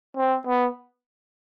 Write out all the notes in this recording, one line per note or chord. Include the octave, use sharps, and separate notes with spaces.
C4
B3